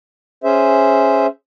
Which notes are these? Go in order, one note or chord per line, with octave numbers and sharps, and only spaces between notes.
C#4 G#4 C5 E5